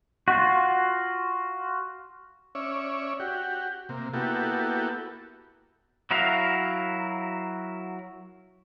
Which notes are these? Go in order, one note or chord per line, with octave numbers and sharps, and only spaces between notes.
F4 F#4
C#4 C#5 D5 E5
F#4 G4
C3 A#3
A#3 B3 E4 F#4 G4 A4
F#3 E4 F#4 A#4 F5